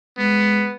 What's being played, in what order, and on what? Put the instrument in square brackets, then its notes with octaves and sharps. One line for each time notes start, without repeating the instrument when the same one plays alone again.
[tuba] G#3 [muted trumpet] B3